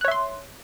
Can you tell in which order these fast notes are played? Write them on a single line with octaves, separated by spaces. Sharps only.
F#6 C#5 E5 C6